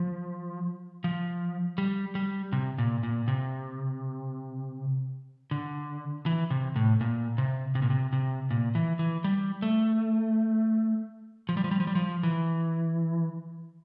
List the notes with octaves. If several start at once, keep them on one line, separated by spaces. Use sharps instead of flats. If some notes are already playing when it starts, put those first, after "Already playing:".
Already playing: F3
F3
G3
G3
C3
A#2
A#2
C3
D3
E3
C3
A2
A#2
C3
C3
A#2
C3
C3
A#2
E3
E3
G3
A3
F3
G3
F3
G3
F3
G3
F3
E3